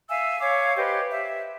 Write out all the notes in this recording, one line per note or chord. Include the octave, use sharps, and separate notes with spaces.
E5 F5 G#5 E6
C#5 F5 D6
G4 B4 C5 D#5
E5